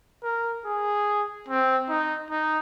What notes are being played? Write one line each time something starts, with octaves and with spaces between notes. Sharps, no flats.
A#4
G#4
C4
D#4
D#4